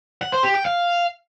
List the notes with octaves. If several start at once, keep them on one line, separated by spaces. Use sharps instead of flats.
F#5
C5
G4
G5
F5